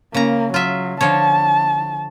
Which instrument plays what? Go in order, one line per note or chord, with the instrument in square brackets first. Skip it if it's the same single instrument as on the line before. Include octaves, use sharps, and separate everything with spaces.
[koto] C#3 A#5 [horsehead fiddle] A#3
[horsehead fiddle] F#3 [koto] F4 E5
[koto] D3 F3 C#5 [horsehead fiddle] A5